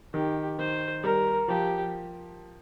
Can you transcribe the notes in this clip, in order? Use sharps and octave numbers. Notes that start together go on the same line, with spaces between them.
D#3 G4
D#3 C5
G3 A#4
F3 G4